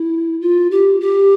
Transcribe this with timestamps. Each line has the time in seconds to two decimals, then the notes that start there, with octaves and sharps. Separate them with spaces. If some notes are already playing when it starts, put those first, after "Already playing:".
Already playing: E4
0.41 F4
0.71 G4
1.01 G4